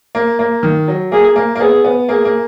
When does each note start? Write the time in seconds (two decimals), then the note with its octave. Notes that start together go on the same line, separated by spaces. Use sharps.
0.15 A#3
0.39 A#3
0.63 D#3
0.88 F#3
1.12 A#3 G#4
1.36 A#3
1.55 A#3
1.60 B3 G#4
1.85 B3
2.09 A#3 G#4
2.25 A#3